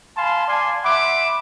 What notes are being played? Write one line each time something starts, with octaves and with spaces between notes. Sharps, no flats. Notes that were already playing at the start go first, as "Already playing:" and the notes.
F5 G#5 A5 B5 C6
D5 F5 G#5 A5 C6
E5 F#5 B5 C6 D6